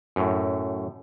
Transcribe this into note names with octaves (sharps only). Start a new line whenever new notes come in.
F#2 A2